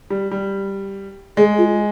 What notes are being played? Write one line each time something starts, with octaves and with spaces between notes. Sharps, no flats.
G3
G3
G#3 G#4
F4